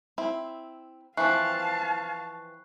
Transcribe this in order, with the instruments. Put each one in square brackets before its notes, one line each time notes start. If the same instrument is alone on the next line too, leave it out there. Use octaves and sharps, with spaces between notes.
[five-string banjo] C4 E4
[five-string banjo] E3 F3 C4 [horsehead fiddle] F5 A5 [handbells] C#6 F#6 C7